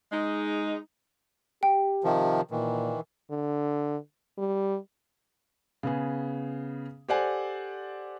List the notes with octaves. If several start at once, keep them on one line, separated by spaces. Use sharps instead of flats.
G#3 D#4
G4 G5
C3 D#3 F3
A#2 D#3 E3
D3
G3
C#3 B3 G#4
G4 A4 C5 D5 F#5 G#5